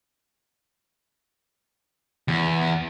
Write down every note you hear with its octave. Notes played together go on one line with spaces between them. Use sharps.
E2